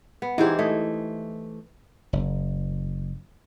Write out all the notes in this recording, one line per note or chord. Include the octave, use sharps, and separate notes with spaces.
B3
E3 D#4 G4 G#4 C5
A3 D#5
F#1